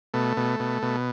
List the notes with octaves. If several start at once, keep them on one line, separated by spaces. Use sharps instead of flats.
B2 A3
B2
B2
B2